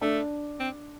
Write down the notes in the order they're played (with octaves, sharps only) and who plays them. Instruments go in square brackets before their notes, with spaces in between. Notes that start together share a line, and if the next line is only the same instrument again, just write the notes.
[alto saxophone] A3 [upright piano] D4
[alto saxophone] C4